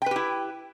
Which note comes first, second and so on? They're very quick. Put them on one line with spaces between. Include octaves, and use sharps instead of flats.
G5 B4 G4 E4